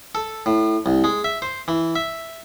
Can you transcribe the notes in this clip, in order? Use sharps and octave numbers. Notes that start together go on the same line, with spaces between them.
A4
A2
C2
G#3
E5
C5
E3
E5